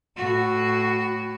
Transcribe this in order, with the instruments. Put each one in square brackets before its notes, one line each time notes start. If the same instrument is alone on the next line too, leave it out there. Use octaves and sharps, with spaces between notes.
[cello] A2 F#4